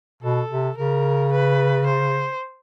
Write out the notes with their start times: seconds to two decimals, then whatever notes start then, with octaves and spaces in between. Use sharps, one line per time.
0.23 B2 A4
0.50 C3
0.77 C#3 A#4
1.32 B4
1.86 C5